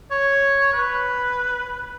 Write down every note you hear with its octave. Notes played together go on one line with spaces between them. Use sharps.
C#5
B4